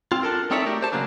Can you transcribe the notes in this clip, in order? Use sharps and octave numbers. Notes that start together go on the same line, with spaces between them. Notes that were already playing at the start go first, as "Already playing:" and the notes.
C4 F4
D4 A4 A#4
C4 D#4 A4 C#5 D5 E5
A3 F#4 G4 A#4
G4 C5 A5
C#3 F#3 G#3 A#3 D4